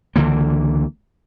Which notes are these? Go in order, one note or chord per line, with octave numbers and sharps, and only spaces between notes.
C#2 D3 E3 A#3